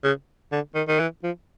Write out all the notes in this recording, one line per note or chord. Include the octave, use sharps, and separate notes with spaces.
C#3
D3
D#3
D#3
E3
F3